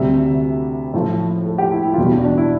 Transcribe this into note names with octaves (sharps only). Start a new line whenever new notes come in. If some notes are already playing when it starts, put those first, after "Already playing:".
Already playing: D2 C3 G3 E5
A2 F3 A3
A4
G4
E4
E4
F4
E2 B2 G3 E4
D4
D4
E4